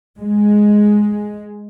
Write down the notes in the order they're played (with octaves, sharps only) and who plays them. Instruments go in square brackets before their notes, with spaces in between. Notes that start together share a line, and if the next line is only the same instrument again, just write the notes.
[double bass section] G#3